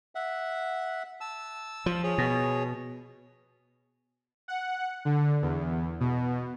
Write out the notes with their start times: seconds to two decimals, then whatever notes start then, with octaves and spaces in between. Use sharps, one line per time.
0.15 E5 F#5
1.21 A5 E6
1.86 F3
2.03 G#4 C#5
2.18 B2
4.48 F#5
5.05 D3
5.42 E2
6.00 B2